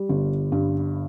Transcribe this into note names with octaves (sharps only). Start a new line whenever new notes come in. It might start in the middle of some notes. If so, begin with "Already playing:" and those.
Already playing: G3
G1
G2